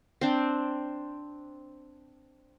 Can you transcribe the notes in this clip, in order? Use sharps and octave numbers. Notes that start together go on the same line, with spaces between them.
C4 D4